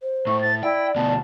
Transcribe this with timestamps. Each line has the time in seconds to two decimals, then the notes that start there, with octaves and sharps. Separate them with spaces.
0.02 C5
0.27 A2 C#6
0.41 A6
0.63 E4 D5 G5
0.96 D2 B2 A5